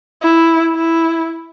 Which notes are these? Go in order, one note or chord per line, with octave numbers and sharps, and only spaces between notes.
E4
E4